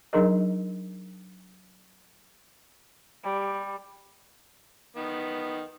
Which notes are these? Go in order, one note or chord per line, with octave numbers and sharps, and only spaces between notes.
F#3 D4 D#4 G#4 A#4 D#5
G3
D#3 B3